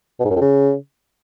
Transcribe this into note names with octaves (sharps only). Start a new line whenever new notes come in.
B2
G#2
F#2
F2
C#3